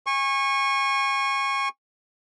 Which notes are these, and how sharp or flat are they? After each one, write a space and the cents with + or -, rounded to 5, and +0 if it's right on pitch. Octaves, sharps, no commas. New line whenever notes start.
G#5 -30 C#6 -20